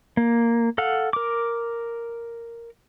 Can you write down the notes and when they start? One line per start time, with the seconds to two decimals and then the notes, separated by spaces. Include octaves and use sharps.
0.17 A#3
0.78 A4 F5 F#5
1.13 A#4 D6